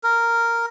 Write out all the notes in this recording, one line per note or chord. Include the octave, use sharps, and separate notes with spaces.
A#4